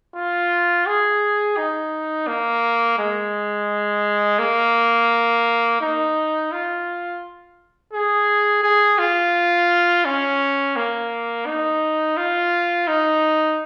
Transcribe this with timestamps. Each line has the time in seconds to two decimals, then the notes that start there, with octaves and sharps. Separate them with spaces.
0.15 F4
0.87 G#4
1.57 D#4
2.28 A#3
2.99 G#3
4.39 A#3
5.81 D#4
6.52 F4
7.93 G#4
8.64 G#4
8.99 F4
10.05 C#4
10.76 A#3
11.47 D#4
12.18 F4
12.88 D#4